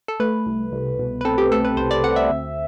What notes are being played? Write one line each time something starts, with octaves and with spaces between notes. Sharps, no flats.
A4
A3 B4
C2
C2
B2
B4
C4 A4
G4
A3 A4
B4
C2 C5
D5
C4 F#5
E5
D2